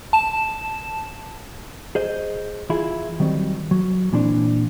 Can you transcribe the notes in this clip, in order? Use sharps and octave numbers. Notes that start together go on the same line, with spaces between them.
A5 E7
G#4 C5 D#5
E3 E4 F4 G#4
D#3 F#3 G3 C4
F#3
A#2 E3 C4 D4